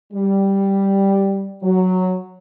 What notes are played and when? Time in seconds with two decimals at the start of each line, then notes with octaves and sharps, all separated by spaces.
0.12 G3
1.63 F#3